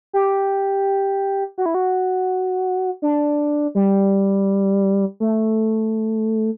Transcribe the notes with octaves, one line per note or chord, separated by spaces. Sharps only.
G4
F#4
E4
F#4
D4
G3
A3